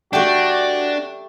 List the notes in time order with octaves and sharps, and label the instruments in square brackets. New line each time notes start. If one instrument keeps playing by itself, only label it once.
[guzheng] A3 G4 [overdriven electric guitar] D4 [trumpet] F#4